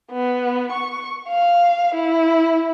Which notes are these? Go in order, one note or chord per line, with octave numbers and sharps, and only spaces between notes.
B3
C#6
F5
E4